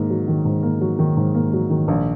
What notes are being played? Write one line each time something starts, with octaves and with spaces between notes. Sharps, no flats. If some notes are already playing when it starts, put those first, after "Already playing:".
Already playing: G#2 D#3 A#3
F#3
D#3
G#2
A#3
F#3
D#3
G#2
A#3
F#3
D#3
A#1